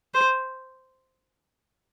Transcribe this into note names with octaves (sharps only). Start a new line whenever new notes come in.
C5